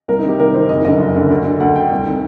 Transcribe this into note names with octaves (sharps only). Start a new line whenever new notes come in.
C2 A#4
D#4
C3 D#3 G4
C2 A#4
C3 D#3 C5
F#1 D#5
F#2 D3 D#5
F#1
F#2 D3
D2
D3
D2 F#5
D3 G5
C2
C3 D#3